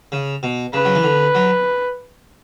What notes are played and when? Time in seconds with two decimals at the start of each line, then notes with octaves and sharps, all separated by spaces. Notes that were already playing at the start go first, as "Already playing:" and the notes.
0.12 C#3
0.43 B2
0.73 C#3 B4
0.85 F#3
0.95 E3
1.04 D3
1.35 F#3